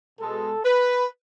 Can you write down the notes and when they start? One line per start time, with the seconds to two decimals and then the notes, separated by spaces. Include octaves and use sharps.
0.20 B2 G#3 A4
0.65 B4